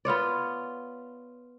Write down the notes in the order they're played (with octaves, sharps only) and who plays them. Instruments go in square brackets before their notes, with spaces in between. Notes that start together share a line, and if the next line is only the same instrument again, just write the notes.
[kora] B3 F4 C#5 D5